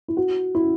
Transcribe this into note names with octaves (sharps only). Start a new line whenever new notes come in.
E4
F#4
E4